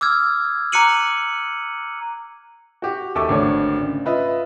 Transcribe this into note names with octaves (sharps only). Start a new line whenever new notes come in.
D6 E6 F6 G#6
A#5 D6 F#6 C#7 D#7 F#7
F#4 G4
D#2 A4 E5 C#6 D6
G#1 D3 A3 D4 C#5
C#3
F4 B4 D#5 E5